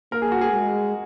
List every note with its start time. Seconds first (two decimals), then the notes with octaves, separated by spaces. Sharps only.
0.11 A#3 A#4
0.22 G#4
0.32 F#4
0.41 G#4
0.51 G#3